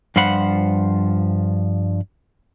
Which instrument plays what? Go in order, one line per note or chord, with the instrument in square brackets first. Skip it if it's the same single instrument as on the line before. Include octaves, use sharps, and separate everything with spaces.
[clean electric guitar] G2 F3 F4 C5 F#5 B5